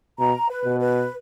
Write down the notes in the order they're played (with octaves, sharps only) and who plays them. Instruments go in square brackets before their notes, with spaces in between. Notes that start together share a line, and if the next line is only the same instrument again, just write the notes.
[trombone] B2 [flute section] A#5
[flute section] B4
[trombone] B2
[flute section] B4